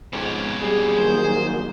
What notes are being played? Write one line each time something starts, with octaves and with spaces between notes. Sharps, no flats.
F2 G#2 B2 C#4
A#1 G3 G#4 C7
D#3 F#3 A#3 C5